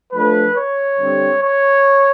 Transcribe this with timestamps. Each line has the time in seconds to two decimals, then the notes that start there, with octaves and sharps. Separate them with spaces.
0.13 F3 A3 D4 B4
0.57 C#5
0.99 D3 G3 C4
1.43 C#5